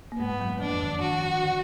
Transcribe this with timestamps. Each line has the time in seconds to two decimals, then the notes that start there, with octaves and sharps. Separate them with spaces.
0.12 A#3
0.19 G#2 G#3 B3
0.40 F#2 F#3
0.60 F2 F3 D4
0.81 D#3
1.01 D#3 F#4
1.43 D3